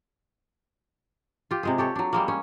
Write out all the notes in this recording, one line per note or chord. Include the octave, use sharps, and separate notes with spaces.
F4 G4
C3 G#3 G#4
G4 A4 C#5
F#3 D4
G3 G#3 A#3
C#4